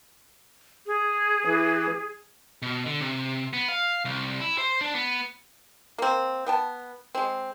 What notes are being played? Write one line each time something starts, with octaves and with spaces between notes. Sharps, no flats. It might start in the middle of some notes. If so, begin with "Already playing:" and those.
G#4
E3
B2
D3
C3
B3
F5
C2
E4
C5
D4
B3
A#3 C4
B3 G5 A5
G#3 C4